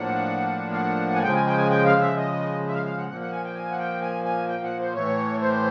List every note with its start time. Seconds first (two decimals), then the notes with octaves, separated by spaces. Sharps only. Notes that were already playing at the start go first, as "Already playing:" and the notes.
Already playing: A2 F3 A#3 D4 F#5
0.73 F5
0.77 F#5
1.13 G#5
1.23 C#3 F3 G#3 G5
1.35 G#5
1.46 G5
1.57 G#5
1.70 G5
1.85 F5
2.01 E5
2.17 D#5
2.68 E5
2.74 F5
2.86 F5
2.98 F#5
3.09 A#2 F3 A#3 F#5
3.21 F#5
3.32 G#5
3.44 G5
3.55 G#5
3.71 F#5
3.79 G5
4.01 G#5
4.24 G#5
4.48 G5
4.63 F#5
4.80 C5
4.94 A2 E3 A3 C#5
5.41 C5